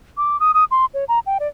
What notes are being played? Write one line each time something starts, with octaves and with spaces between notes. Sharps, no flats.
D6
D#6
D#6
C6
C#5
A#5
G5
D5